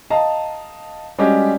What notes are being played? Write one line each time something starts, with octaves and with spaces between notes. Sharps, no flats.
D#5 F5 A5 A#5
G3 G#3 C#4 D4 F#4 G4